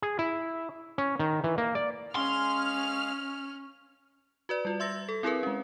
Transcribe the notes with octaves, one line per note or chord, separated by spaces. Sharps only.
G#4
E4
C#4
D#3
E3
A#3
D5
G#3 C#4 G#4 F5 C6 F6
F#4 B4 D5
G3 F4
E5 C6 E6 A6 A#6
A4
C4 E4 G#4 A#4 B4
G#3 C#4